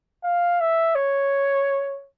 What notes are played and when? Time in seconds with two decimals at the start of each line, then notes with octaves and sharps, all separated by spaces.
0.24 F5
0.61 E5
0.95 C#5